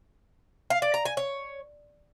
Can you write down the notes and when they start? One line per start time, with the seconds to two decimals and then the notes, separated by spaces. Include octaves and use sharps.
0.70 F5
0.82 D5
0.94 A#5
1.05 G#5
1.17 C#5